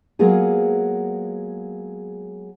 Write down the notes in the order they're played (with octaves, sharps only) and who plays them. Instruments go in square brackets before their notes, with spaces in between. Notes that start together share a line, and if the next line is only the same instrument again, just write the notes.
[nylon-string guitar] F#3 G#3 A#3 B3 F4 G#4